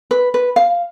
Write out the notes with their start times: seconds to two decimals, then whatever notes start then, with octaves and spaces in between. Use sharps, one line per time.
0.11 B4
0.34 B4
0.56 F5